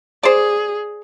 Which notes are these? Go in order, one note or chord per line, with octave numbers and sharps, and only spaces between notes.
G#4 C5 D5